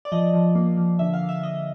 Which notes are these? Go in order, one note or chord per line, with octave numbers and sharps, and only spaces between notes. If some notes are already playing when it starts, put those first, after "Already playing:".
D5
F3 D#5
F3
A#3
F3
D3 E5
F5
D3
E5
D3 D#5